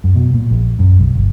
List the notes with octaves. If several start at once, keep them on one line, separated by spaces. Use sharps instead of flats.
F#2
B2
A#2
A#1
F#2
B1
G1